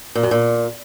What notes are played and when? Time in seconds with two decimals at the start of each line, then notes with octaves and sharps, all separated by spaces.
0.15 A#2
0.23 F#2
0.31 A#2